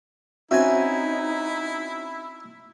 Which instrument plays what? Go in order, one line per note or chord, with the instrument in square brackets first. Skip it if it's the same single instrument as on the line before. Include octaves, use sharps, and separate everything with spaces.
[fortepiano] C4 C#4 F#4 [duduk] D#4 [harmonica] E4 [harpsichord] E5 G#5